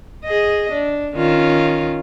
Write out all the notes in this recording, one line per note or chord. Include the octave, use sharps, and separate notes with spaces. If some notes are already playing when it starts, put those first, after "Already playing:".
G#4 D#5
D4
D#3 C#4 F4